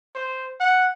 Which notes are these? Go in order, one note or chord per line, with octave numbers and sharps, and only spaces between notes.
C5
F#5